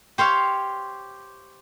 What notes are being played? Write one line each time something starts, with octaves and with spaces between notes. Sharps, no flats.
G4 C5 C#5 F5